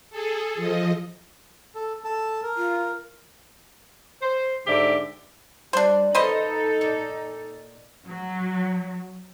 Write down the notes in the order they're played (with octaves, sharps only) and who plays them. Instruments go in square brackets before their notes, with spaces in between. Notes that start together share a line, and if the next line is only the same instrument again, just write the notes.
[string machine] G#4 A4
F3 D#5
[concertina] A4
A4 A5
A#4
[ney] F4
[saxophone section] C5
G#2 D3 G4 D5 E5
[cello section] G3 [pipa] D4 C5 [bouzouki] D5
[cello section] D#4 A4 [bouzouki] F4 [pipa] B4 C5 D#5
[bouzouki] A#2
[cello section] F#3